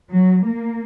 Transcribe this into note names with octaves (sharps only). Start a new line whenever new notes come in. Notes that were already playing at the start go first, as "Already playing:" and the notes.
F#3
A#3